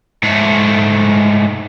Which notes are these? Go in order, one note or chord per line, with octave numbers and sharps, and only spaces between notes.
G#2 A3